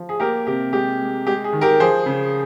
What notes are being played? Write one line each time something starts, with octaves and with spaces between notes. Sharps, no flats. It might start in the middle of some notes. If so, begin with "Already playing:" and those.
Already playing: F3
G#4
A#3 G4 A#4
C3 G4
G#3 G4
G#3
G#3 G4
G#4
D#3
G4 A#4
F3 G#4 C5
C#3